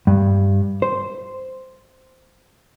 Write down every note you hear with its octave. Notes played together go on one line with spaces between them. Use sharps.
G2
C5